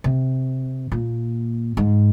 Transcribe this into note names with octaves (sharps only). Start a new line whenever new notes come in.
C3
A#2
G#2